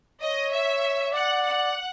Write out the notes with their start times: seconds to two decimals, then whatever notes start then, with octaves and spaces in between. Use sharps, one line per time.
0.22 C#5 D#5
0.52 E5
1.13 D5 F#5
1.43 F#5